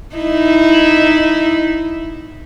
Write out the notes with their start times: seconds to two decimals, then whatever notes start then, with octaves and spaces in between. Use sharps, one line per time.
0.16 D#4 E4